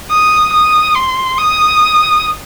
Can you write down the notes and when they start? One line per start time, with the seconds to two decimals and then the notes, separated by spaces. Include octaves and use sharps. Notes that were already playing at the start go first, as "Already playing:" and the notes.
0.11 D#6
0.53 D#6
0.95 C6
1.38 D#6